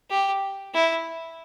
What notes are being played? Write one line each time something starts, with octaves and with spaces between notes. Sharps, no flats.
G4
E4